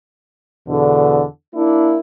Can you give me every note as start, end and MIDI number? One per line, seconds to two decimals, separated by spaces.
0.67 1.23 40
0.67 1.23 47
0.67 1.23 50
1.54 1.97 58
1.54 1.97 62
1.54 1.97 64